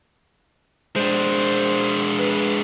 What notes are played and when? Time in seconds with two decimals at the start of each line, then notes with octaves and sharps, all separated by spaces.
0.96 G#3 D4 C5
2.19 B4